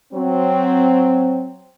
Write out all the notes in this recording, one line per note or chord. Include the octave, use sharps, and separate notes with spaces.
F#3 C4